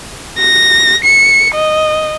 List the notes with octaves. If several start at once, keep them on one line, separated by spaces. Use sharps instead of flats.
A#6
C#7
D#5